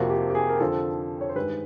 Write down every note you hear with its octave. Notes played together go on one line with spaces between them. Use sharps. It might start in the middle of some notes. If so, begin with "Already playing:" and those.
Already playing: F2 C3 F3 A#3 F#4
G4
G4
G#4
A#4
F2 D3 F3 A4
C#5
C5
G2 D#3 G#3 B4